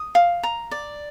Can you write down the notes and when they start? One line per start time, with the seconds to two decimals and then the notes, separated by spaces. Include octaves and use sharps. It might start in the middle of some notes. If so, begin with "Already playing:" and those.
Already playing: D#6
0.15 F5
0.43 A#5
0.71 D5